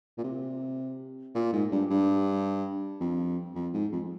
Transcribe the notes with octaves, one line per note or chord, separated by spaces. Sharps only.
A#2
C3
A#2
G#2
G2
G2
F2
F2
G#2
F2